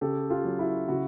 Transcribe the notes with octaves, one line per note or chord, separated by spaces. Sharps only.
C#3 G4 A4
F4 G4
F#3
E4 F#4
C#3 E4 F#4